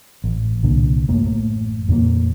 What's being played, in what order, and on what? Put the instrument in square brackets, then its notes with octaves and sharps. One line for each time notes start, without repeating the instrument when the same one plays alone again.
[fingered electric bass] A1
C2 A#2 D3
A1 F#2 A3 A#3
F2 A#2 E3 A#3